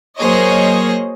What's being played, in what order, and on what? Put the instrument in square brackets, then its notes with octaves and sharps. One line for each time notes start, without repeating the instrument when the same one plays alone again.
[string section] F#3 A#3 G#4 C5 C#5 D#5